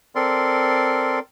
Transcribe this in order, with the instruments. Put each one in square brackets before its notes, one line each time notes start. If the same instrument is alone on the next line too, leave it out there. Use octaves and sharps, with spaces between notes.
[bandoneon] C4 A4 A#4 D5 C6